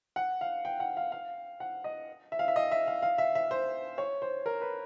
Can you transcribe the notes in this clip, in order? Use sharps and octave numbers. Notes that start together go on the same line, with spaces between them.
F#5
F5
G5
F#5
F5
F5
F#5
D#5
E5
F5
E5
D#5
E5
F5
F5
E5
E5
C5
C#5
C5
A#4
B4